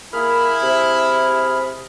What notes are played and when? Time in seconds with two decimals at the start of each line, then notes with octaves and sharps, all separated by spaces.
0.13 A#3 E4 G#4 B5 F6
0.63 C3